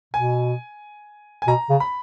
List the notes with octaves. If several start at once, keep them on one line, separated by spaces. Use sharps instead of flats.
B2 G#5
G#5
B2 A#5
C#3
B5